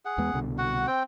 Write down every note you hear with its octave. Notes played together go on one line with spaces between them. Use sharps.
G#4 F#5
E2 G#3 B3
C2 B2 D3
F#4 F#5
C4 G5